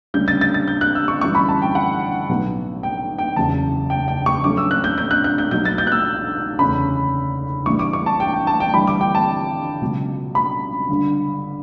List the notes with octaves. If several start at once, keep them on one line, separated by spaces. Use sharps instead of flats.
D2 C#3 G3 C#4 G6
A6
A6
A6
G6
F#6
E6
C#6
G1 F#2 E3 G3 C#6
B5
A5
G5
F#5
B1 A2 F#3 B3
G5
G5
F#1 E2 C#3 F#3 A5
G5
G5
C#6
G2 F#3 A3 C#4 D6
E6
F#6
G6
G6
F#6
F#6
G6
B1 B2 F#3 G6
A6
G6
F#6
E6
F#1 E2 D3 A3 C#4 B5
A1 G2 E3 G3 C#6
D6
C#6
A5
G5
G5
A5
G5
G1 G2 E3 G3 B5
D6
G5
A5
C#2 B2 F#3
B5
G1 G2 D3